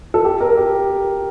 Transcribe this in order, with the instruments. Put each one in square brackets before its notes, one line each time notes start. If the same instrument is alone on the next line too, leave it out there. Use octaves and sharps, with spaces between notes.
[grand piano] A4
G4
A#4
G4